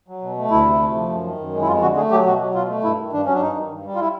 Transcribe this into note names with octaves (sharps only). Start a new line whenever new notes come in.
F#3
B2
A3
D2 E4
C3
A3
F3
F#2
D#3
F#2
G#3
E4
F2 F4
D3 F#4
A3 G#4
F#3 G4
B2 F#4
F#3
B2 F4
A3
G2 E4
D#3
G2 D4
F#3 C#4
D4
G2 D#4
D#3
G2
G3
F4
E4